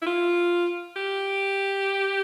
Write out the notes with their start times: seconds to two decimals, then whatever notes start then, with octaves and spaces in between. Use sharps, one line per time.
0.02 E4
0.06 F4
0.96 G4